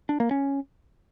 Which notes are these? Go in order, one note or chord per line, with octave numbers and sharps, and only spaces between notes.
D4
A#3
C#4